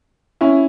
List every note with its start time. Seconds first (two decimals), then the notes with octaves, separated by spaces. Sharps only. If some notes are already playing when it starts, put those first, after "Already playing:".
0.41 C#4 E4